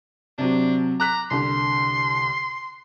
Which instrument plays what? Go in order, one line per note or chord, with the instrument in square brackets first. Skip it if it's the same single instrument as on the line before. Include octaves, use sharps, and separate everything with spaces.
[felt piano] C3 F#3 C4 [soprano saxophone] D4
[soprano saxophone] A#5 [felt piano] D6 F#6 B6
[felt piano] C2 D3 [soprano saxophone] C6